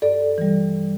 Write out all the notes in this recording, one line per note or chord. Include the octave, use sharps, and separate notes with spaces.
G2 A4 D5
E3 G3